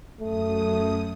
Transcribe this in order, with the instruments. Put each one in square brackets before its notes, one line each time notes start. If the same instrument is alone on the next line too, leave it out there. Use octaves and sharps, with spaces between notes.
[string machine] F#2 D#6 [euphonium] A3